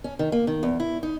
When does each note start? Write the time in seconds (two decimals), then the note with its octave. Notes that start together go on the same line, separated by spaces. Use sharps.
0.04 C#4
0.19 D#3
0.32 A#3
0.47 D#3
0.63 E2
0.80 E4
1.03 D#4